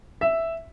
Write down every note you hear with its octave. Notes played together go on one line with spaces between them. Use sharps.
E5